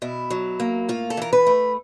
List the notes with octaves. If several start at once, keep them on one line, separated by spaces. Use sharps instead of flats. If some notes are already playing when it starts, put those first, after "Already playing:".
B2 E4
F#3
A#3
A2 F4
A4
E3 A#4
B4
A3